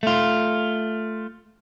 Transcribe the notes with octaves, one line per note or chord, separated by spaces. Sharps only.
A3 F4